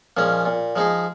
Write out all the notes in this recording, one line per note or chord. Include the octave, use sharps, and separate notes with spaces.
A#2 F3 G#3 C#4
A#2
F3 G#3 D#4 G#4